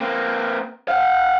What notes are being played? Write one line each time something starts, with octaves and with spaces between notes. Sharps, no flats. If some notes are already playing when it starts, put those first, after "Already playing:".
A#3 C4
F5 F#5